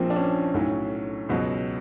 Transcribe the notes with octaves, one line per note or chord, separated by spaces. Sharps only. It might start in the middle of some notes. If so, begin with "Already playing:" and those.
Already playing: A#1 A#2 F3 C4
D4
C#4
B1 A2 F#3
C#2 B2 F#3